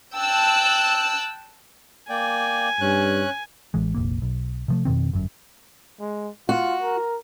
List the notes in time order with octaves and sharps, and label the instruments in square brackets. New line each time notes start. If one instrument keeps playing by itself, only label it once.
[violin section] G5 A5 E6 F#6
[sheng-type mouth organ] A#3 D5 G5 [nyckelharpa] G#5
[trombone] G2 [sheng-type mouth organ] C#4 F#6
[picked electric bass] A1 E3 G#3
F1 A#1 A#3
B1
C3 F3 A3
F2 B2 D#3 C4
G1 F#2
[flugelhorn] G#3
[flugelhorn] F4 [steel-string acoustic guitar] F#4
[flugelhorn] A#4